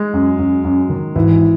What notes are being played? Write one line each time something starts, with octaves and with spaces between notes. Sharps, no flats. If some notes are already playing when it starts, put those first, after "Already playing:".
Already playing: G#3
F#2
F#2
F#2
D#3
G#1 E3